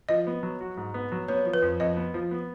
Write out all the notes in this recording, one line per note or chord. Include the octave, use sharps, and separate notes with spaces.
F3 D#5
B3
F#3
F#4
G#2
B3
F#3
B3 C#5
F3
B4
F2
F2 D#5
B3
F3
B3